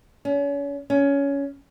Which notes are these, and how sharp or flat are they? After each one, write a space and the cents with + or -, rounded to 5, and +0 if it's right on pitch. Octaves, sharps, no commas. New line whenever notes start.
C#4 +35
C#4 +15